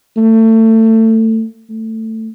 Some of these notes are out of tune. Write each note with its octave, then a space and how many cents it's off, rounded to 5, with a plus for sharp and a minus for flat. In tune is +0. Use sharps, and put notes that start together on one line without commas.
A3 +25
A3 +15